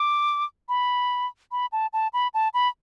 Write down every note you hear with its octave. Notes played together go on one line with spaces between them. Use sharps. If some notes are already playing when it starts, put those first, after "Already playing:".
Already playing: D6
B5
B5
A5
A5
B5
A5
B5